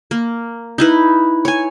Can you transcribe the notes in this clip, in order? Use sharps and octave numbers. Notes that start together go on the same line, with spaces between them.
A#3
D#4 E4 B4
C#5 G#5